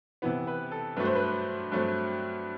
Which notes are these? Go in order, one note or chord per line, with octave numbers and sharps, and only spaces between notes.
C3 E3 B3
B4
A4
G2 F#3 A3 B4
C5
B4
G2 F#3 A3 C4